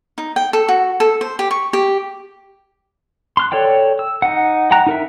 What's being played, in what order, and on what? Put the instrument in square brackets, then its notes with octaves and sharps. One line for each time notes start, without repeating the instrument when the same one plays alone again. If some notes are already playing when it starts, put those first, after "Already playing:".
[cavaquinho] D#4
G5
A4
F#4
A4
C5
G4
C#6
G4
[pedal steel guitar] C6 F6 F#6
A4 C#5 D5 G5
E6
D#4 F#5
F#5 G5 A#5 F#6
D#4 A#4 E5